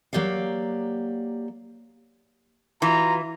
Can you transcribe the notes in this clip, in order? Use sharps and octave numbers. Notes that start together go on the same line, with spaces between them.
F#3 A#3 G4 D5 F5
E3 F4 F#4 A#5